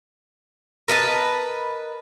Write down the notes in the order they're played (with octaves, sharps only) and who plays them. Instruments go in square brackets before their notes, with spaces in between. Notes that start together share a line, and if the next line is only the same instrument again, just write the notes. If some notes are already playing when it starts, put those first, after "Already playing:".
[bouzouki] A#4 B4 D#5 A5